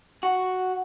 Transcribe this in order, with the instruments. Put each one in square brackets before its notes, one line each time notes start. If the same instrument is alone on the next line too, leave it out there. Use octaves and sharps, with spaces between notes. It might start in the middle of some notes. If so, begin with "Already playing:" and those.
[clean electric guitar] F#4